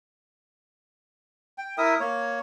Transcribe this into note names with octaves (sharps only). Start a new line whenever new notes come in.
G5
E4 A#4 E5 D#6
A#3 C#5